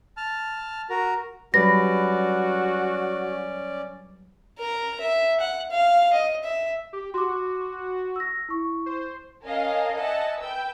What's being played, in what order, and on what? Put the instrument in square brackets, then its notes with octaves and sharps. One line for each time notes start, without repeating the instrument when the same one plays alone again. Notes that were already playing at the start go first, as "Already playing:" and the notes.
[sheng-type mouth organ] A5 F6
F#4 A#4 A#5
[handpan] F#3 G3 B4 [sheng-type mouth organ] C#4 D5 [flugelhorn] F#4 [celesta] A#6
[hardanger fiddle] A#4 A#5
E5
F#5
F5
D#5
E5
[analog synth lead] G4
[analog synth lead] F#4 [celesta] C6 D6
[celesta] E6 A#6
E4 C#6
[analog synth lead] C5
[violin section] C#4 A#4 D#5 F5 G#5 A5
D#5 E5 F#5 G#5 A5
B4 G5 E6 G6